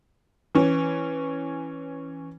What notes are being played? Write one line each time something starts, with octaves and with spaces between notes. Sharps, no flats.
E3 C#4